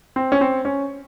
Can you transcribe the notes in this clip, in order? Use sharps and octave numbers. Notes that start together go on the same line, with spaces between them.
C4
C#4
C4
C#4